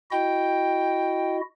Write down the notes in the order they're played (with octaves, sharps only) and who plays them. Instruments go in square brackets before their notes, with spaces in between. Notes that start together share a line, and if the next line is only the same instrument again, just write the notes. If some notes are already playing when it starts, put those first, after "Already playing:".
[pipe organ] E4 F#4 D#5 [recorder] G5